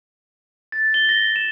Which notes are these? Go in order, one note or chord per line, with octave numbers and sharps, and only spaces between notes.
A6
G7
A#6
E7